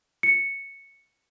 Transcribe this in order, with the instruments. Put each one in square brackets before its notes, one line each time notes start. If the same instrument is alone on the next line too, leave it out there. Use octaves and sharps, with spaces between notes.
[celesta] C#7